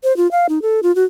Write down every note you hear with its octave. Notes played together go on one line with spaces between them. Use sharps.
C5
F4
F5
D#4
A4
F4
F#4